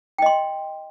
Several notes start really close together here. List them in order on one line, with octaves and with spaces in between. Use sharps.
G5 D#5 C6